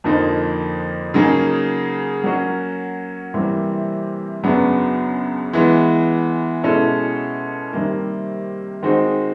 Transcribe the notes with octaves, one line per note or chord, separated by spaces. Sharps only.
F2 D3 F3 A#3 D#4
C#3 F#3 A#3 D#4 G#4
F#3 A#3 C#4 F#4
C3 E3 G3 A#3
F#2 C#3 F#3 B3 D4
E3 G#3 B3
B2 G#3 C#4 E4 A4
C3 D#3 G3 A#3
D#3 G#3 C4 D#4 F#4